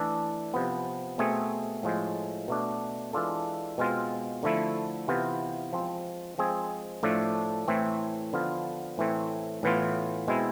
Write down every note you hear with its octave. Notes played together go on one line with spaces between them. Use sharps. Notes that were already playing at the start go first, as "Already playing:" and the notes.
Already playing: E3 A3 D4 A4
C3 F3 B3
B2 A3 C4 G#4
A2 F3 G#3
B2 A3 D4
E3 G#3 D4 F4 A4
B2 G#3 C4 F4
D3 F3 A3 E4
C3 E3 B3 F4
F3 G#3 C4
F3 G#3 C4 G#4
A2 F3 A3 D4 A4
A2 E3 A3 C4
D3 F3 B3 F4
A2 E3 A3 C4
A2 E3 B3 F4
B2 G#3 C4 E4